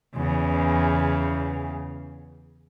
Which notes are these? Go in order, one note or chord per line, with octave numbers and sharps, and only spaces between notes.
E2 C#3